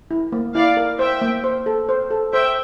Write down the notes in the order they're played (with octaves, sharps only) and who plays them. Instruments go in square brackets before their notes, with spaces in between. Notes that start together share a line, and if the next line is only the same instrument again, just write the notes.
[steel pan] E4
A#3
[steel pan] E4 [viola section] D5 F5
[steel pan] A#4
[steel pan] C5 [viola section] E5 G5
[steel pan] A#3
C5
A4
C5
A4
[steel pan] C5 [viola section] E5 G5